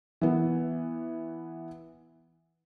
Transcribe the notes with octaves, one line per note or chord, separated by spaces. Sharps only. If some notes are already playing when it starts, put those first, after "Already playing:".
E3 B3